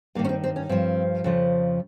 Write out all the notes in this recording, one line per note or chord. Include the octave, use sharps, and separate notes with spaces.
G2 D#3 A#3
C#4
C4
C4
C#4
G2 F3 C4
F2 C#3 F3